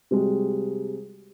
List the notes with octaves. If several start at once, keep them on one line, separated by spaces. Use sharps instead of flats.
C3 G3 G#3 F#4